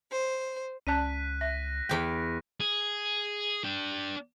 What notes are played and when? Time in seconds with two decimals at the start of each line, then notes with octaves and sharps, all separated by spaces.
0.12 C5
0.87 C#2 C#4 D5 A5 F#6 B6 D#7
1.41 E5 A#6
1.89 E2 G5
2.60 G#4
3.64 D4 G5